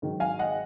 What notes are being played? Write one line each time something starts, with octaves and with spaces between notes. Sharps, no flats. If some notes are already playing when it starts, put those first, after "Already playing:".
G#2 D#3 F#3
F5 G#5
D#5 F#5